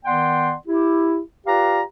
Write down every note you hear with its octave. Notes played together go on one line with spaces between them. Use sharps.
D#3 B3 D5 F#5 G5 C6
E4 G4
F4 G4 B4 D5 F5 A#5